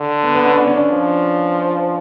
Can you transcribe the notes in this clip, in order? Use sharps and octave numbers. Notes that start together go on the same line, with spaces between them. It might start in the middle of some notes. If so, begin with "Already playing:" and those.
Already playing: D3
B3
B3
C#4
D4
C#4
D4
F3